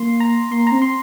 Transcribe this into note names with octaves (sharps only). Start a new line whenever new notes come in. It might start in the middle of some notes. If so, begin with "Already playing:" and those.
Already playing: A#3 C6
A#5
A#3 C6
C4 A#5
C6